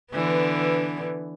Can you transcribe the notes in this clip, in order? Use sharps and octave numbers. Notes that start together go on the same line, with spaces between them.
D3 E3 B3